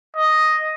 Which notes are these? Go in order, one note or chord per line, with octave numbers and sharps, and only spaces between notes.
D#5